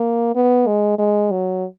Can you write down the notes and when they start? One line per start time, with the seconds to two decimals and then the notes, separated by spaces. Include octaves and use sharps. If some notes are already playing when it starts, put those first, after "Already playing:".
Already playing: A#3
0.35 B3
0.67 G#3
0.98 G#3
1.31 F#3